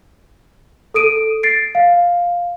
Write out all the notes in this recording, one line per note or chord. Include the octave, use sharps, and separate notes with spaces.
A4 D#6 D7 D#7
A6 C7 D7
F5